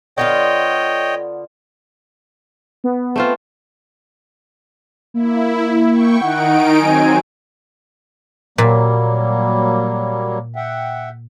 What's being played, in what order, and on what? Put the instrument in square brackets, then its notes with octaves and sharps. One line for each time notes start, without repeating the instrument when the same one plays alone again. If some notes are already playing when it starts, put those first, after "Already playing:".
[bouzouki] D3 B3 F4 [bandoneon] C#5 D#5 G5
[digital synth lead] B3
[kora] A3 C4 F4
[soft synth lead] A#3 [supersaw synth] E4
[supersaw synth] G5 C#6
[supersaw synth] D#3 D#4 D7 [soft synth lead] F#5
[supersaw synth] F#3 C4 [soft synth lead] G#5
[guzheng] A#2 [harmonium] F#3 G3 A#3
[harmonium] E5 F#5 G5